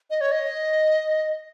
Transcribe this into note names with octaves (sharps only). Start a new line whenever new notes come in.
D#5
C#5
D#5